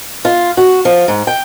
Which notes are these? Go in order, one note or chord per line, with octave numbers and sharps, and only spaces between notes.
F4
F#4
F3
G#2
G5